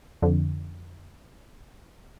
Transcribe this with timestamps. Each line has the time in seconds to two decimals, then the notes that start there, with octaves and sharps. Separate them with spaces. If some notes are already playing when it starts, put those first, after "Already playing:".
0.22 F2 D3